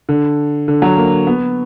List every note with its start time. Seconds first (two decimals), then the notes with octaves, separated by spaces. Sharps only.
0.09 D3
0.68 D3
0.82 F#3
0.97 A#3
1.27 B3